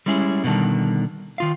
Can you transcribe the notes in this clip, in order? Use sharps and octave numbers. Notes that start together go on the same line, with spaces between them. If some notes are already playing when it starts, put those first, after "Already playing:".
G3 G#3 C#4 E4 G#4
B2 D3 D#3 G3 A5
D#3 F4 F5